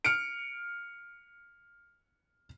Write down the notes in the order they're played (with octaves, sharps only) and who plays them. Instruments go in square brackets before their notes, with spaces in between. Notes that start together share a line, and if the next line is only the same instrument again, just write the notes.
[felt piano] F6 C#7 D7